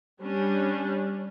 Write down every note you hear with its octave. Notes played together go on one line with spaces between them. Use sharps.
G3 C#4 D4